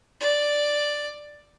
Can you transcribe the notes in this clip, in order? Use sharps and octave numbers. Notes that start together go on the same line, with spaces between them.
D5